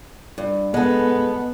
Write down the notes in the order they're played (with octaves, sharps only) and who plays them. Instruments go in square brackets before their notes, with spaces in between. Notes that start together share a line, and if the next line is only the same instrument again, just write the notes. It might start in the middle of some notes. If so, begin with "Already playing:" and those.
[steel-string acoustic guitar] G2
[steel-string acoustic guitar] G#3 A4 [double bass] B3